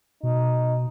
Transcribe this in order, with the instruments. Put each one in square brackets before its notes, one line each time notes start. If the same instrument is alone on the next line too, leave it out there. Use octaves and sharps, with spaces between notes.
[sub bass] B2 [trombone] D#4